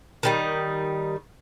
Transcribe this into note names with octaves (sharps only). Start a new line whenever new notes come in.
D#3 G3 D#4